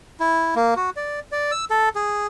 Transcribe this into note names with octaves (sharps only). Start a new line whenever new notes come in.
E4
A#3
F#4
D5
D5
E6
A4
G#4